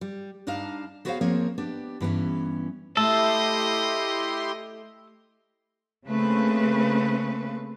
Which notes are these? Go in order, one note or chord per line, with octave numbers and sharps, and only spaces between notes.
G3
G2 D4 D#4 D#5 F5 A5
B3 F#4 G#4 C5 C#5 F5
F3 A#3 C4 G#4 A#4 C#5
B3 D4 G4
G2 E3 B3 C#4
A3 E4 G4 A4 D#5 C6
C#3 A3 A#3 C4 B4